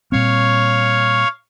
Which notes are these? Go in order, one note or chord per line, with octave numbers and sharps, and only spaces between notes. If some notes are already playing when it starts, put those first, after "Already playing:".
A#2 G3 C4 C#5 F5